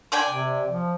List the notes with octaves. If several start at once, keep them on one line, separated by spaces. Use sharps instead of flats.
D5 G5 G#5
C3
F3